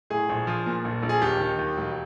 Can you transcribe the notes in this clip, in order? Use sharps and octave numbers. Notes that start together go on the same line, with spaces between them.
A2 G#4
A#1
F3
A#2
A#1
A#1
G#4
D#2 G4
D#3
D#2
E1